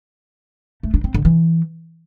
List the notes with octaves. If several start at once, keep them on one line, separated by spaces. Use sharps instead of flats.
A3
D4
C4
D3
E3